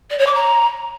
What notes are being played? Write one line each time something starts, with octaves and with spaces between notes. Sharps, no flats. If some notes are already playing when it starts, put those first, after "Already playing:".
D5
C#5
D6
A#5